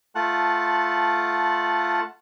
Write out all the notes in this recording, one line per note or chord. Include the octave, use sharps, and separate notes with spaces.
A3 F4 F#5 A5 F#6